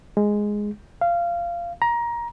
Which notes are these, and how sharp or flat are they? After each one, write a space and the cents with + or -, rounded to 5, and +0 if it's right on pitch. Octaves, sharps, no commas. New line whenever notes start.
G#3 +0
F5 -20
A#5 +20